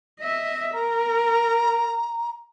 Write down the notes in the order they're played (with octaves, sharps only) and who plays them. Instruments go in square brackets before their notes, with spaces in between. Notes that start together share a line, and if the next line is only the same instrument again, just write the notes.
[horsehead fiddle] D#5 E5
[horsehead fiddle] A#4 [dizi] A#5